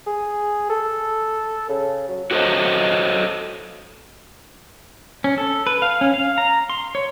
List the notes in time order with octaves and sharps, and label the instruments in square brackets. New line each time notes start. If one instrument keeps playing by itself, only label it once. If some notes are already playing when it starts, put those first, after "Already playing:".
[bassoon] G#4
A4
C#3
F#3
[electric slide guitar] F#4 A4 C5 C#5 D#5
[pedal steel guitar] C#4
A4
B4
F5
C#4
F5
A#5
C6
C#5